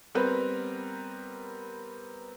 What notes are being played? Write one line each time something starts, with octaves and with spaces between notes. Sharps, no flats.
G3 B3 C4 A#4 B4